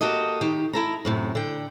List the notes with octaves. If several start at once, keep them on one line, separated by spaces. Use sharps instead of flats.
A#3 F#4 G4 A4 D#5
D#3 G4
E4 A4 A#5
F#2 A2 C3
D3 G5